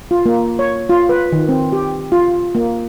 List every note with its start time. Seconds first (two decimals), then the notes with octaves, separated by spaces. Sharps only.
0.11 F4
0.26 A#3
0.59 C#5
0.90 F4
1.09 B4
1.32 D#3
1.49 C4
1.72 G4
2.12 F4
2.55 A#3